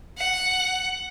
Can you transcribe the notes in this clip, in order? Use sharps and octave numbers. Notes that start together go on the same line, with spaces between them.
F#5